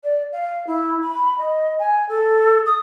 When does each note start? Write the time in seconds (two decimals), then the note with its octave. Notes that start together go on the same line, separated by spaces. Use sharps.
0.04 D5
0.33 F5
0.67 E4
1.02 B5
1.38 D#5
1.79 G#5
2.09 A4
2.66 D#6